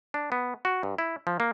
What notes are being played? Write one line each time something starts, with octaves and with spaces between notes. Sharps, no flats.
D4
B3
F#4
G2
E4
F3
A#3